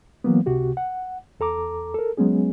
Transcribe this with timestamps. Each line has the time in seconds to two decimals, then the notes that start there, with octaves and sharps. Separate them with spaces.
0.24 E3 F#3 A#3 B3
0.46 C#2 C3 F#4 G4
0.77 F#5
1.40 E2 A4 A#5 D6
1.94 A4 A#4
2.17 F#3 G#3 B3 C#4 G#4